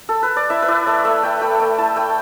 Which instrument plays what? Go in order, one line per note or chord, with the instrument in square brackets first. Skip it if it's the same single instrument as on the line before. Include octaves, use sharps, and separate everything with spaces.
[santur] A4
B4
D5
E4 E5
B4
E4 D5
A3 D5
A3 E5
A3 G5
A3 G5
A3 G5
E4 A5
A3 G5